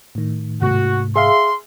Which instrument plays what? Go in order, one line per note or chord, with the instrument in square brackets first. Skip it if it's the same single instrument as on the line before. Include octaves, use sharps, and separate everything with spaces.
[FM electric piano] A2 D#3
[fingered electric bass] G#2 C3 A3 [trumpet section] F#4
[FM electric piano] G#4 E5 F5 [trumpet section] C6